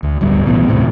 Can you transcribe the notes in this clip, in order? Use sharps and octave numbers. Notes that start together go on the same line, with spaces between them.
D2
D1 G1 G2
B1 A2 E3 B3
D#1 A2 C3 C4